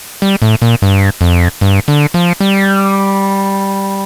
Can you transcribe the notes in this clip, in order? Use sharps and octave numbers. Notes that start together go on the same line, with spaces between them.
G3
A2
A#2
G2
F2
G2
D3
F3
G3